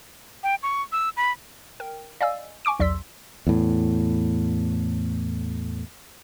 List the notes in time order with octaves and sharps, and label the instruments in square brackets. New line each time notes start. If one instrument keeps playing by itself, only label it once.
[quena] G5
C#6
E6
B5
[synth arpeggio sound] A#4 G5
D5 D#5 F5 G#5 E6
G#5 C#6 D6 D7
B1 E2 D5 C6 E6 B6
[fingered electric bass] E2 A2